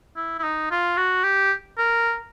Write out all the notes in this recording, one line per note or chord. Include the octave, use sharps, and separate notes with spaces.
E4
E4
D#4
F4
F#4
G4
A#4